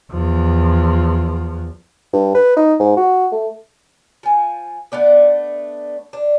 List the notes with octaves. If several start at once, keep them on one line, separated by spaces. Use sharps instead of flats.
E2 F3
G2
B4
D#4
G#2
F#4
A3
F3 G#5
A3 B3 D4 D5
D4